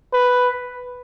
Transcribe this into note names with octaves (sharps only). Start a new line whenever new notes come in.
B4